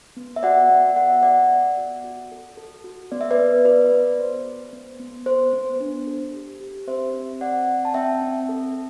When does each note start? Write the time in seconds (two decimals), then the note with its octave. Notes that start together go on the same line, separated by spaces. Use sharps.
0.17 B3
0.36 E5
0.43 F#4 D5 F#5
0.70 B3
0.96 A4 F#5
1.10 E5
1.23 B3 D5 F#5
1.50 B3
1.77 F#4
2.04 F#4
2.32 A4
2.57 A4
2.84 F#4
3.11 B3 D5
3.21 E5
3.31 B4 D5
3.38 B3
3.65 F#4 B4 D5
3.92 B3
4.19 A4 C5
4.45 A4
4.73 B3
4.99 B3
5.26 A4 C5
5.53 B3
5.80 D4
6.07 A4
6.34 G4
6.60 G4
6.87 C4 C5 E5
7.14 C4
7.41 C4 D5 F#5
7.68 C4
7.85 A5
7.94 C4 E5 G5
8.22 C4
8.49 A4